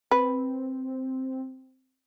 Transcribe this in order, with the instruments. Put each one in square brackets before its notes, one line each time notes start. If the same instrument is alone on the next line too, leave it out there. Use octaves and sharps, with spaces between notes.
[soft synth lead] C4 [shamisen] B4